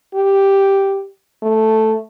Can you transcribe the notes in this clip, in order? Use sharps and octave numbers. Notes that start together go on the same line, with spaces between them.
G4
A3